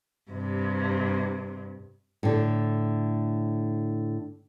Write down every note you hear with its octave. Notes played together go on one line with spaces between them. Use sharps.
G2 C3
A2 D3